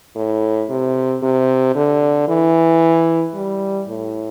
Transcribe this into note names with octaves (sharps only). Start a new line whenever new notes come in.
A2
C3
C3
D3
E3
G3
A2